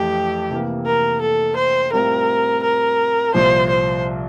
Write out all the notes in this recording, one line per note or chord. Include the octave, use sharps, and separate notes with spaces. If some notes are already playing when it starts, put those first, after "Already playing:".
Already playing: F2 E3 A3 G4
C3 E3 A#3
A#4
A4
C5
A2 G3 C4 F4 A#4
A#4
C2 A#2 F3 C5
C5